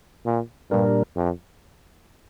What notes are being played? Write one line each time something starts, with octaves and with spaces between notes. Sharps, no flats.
A#2
G2 A#2 G3 D4 A#4
F2